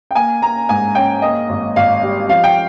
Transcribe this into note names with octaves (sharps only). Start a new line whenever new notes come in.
G5
A#3 G#5
A#3 A#5
G#2 G#5
C#4 G5
A#3 D#5
G#1
G#1 F5
G3
F3 F5
G5